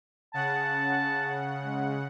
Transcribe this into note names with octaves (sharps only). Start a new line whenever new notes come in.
C#3 F#5 A5
G#3